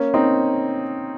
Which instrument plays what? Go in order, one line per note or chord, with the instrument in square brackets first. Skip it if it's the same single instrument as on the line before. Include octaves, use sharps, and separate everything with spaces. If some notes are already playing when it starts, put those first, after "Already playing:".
Already playing: [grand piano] A#3 C#4
C4 D#4